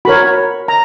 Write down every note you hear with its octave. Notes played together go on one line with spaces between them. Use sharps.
F#4 A#4 C#5 B5
A#5